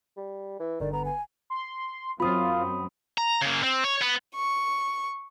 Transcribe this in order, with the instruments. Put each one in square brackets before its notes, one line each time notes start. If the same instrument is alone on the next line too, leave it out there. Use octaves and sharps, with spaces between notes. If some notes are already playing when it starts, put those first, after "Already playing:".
[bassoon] G3
E3
[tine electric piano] G1 D3 [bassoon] D#3 [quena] D5
[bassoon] B3 [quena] A#5
[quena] G#5
[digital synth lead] C6
[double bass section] F#2 F#3 C4 [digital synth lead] F4 [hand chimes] B5 D#6
[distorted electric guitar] A#5
C#3 A#3
C4
C#5
B3
[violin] C#6